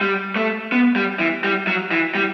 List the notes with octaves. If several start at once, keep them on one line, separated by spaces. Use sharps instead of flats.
G3
A3
B3
G3
E3
G3
F#3
E3
G3